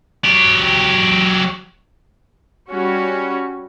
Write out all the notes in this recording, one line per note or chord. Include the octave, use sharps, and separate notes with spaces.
F#3 G4
G3 C#4 F#4